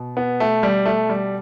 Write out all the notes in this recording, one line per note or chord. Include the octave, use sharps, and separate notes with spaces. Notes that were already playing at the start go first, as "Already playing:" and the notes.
Already playing: B2
B3
A3
G3
A3
G3